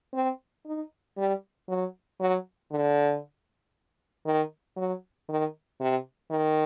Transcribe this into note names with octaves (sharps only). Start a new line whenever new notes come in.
C4
D#4
G3
F#3
F#3
D3
D#3
F#3
D#3
C3
D#3